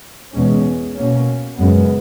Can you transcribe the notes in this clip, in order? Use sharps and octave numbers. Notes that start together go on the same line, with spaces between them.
E2 B2 G#3 C#4
B2 A#3 C#4
F#2 C#3 G#3 B3